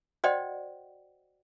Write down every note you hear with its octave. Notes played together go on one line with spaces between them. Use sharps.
F#4 C5 D5 D#5 F#5 G5